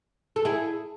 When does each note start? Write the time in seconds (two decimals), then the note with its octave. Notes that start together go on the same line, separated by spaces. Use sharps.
0.36 A4
0.45 E4 G#4